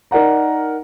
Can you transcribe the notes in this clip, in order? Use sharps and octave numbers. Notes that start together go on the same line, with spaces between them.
D#4 A#4 D5 F#5 A#5